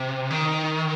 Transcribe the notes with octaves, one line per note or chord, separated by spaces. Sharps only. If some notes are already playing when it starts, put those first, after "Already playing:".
Already playing: C3
D#3